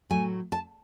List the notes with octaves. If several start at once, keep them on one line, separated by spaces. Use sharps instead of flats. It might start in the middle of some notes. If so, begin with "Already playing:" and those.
A2 F#3 A3 G#5
A5